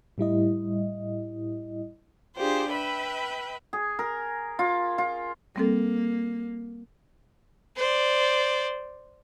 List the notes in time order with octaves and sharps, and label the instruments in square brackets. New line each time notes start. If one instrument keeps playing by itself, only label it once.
[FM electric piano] A2 G3 E4 D#5
[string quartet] D4 F4 G4 G#4 C5
B4 E5 G5 B5
[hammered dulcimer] G#4
A#4
F4
F4
[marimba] G3 C4 A4 [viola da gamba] A#3
[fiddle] C5 D5